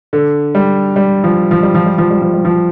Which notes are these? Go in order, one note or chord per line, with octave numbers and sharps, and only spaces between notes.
D3
G3
G3
F3
F3
G3
F3
G3
F3
G3
F3
G3
F3